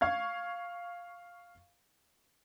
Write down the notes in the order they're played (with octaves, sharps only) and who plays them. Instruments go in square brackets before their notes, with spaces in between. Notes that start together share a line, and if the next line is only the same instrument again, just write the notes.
[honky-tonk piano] F5 C#6 G#6